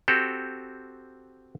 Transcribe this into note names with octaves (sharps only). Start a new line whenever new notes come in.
C4 F#4 G4 A4